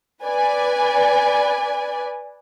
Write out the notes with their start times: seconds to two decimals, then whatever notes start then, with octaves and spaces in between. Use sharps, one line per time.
0.23 B4 D5 G#5